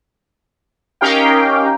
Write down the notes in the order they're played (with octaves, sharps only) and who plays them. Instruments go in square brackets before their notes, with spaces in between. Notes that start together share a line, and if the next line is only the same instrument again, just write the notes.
[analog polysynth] C#4 D#4 G4 A#4 F5 G5